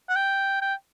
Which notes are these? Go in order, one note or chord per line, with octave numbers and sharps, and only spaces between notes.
F#5
G5
G5